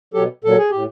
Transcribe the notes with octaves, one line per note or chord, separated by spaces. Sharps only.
B2 F#3 G4 A4
A#2 F#3 A4
G#4
A2 G4